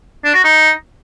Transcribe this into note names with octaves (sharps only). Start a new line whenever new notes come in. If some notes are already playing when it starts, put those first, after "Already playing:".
D4
F#4
D#4